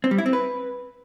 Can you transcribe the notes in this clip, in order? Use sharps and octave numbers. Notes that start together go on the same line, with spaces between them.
C4
G3
E4
C4
B4